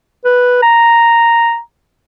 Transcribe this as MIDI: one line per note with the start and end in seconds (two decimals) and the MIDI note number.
0.24 0.61 71
0.62 1.59 82